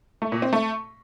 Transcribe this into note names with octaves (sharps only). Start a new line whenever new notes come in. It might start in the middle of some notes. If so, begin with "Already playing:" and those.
A3
A#2
C4
A3